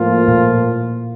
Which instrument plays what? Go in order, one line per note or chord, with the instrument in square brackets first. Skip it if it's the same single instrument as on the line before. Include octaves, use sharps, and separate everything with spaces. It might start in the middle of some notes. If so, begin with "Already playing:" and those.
Already playing: [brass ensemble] A2 F3 A#3 F4
[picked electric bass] A#2